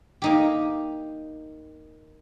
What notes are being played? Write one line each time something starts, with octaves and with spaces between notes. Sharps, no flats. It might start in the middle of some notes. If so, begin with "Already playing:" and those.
A#3 D#4 G4